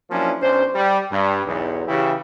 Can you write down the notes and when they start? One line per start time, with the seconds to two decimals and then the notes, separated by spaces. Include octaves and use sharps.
0.11 F3 F#3 A#3 C#4 D4 E4
0.41 B1 C#4 D4 C5
0.75 G3
1.11 G2
1.46 B1 E2
1.87 C#3 E3 E4 G4